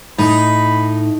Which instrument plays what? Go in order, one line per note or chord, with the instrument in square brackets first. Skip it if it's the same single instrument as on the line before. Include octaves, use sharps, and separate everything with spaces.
[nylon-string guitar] A2 [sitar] D#4 [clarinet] B5